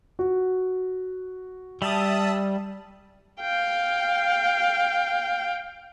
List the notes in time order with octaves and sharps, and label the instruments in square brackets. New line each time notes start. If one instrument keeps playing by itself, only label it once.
[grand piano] F#4
[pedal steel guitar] G3 [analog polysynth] E5 A5 D#6
[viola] F5 G5